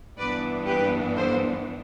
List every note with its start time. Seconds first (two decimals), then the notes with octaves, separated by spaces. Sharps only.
0.18 G2 E3 B3 D4 B4 D5
0.67 G4 B4
1.16 A4 C5